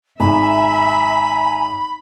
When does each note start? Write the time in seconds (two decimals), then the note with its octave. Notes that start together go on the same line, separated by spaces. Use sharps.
0.20 G#1 E5 G#5 A#5 B5